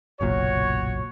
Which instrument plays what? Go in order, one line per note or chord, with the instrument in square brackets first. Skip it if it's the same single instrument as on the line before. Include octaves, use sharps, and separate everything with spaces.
[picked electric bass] F#1 B1 A#2 [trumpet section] F#4 C#5